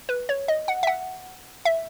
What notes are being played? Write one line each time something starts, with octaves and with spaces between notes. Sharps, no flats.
B4
C#5
D#5
F#5
E5
F#5
E5